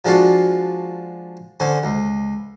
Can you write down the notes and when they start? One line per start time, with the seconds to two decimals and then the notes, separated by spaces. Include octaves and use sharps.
0.05 F3 G#3 D4 F4 F#4
1.60 D3 C#4 C5
1.83 C#2